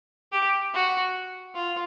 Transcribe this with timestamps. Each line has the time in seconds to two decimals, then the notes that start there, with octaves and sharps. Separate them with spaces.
0.32 G4
0.74 F#4
1.54 F4